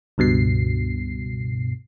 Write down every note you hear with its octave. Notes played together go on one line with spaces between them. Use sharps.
C#2 G2 B2 C7